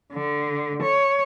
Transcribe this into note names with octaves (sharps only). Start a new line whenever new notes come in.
D3
C#5